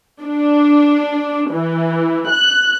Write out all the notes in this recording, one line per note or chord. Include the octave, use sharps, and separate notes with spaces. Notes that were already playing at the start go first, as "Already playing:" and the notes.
D4
E3
F#6